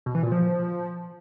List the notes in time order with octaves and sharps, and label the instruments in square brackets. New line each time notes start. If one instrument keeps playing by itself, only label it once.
[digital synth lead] B2
E3
A#2
F3